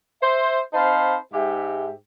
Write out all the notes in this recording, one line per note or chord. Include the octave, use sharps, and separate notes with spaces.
C5 E5
C4 D#4 C5 F5 A5 B5
G#2 G4 E5